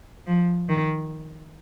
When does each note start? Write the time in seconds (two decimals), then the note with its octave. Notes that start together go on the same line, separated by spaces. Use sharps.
0.27 F3
0.69 D#3